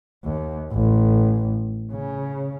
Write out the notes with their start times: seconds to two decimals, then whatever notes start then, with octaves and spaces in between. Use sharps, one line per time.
0.25 D#2
0.72 A1
1.93 C#3